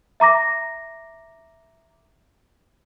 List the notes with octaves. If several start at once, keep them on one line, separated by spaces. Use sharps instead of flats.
E5 A#5 D6 A#6